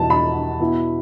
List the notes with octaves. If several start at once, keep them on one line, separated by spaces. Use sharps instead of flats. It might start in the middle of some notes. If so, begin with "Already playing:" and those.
Already playing: E2 B2 G3 E4 A5
B5
B2 B3 E4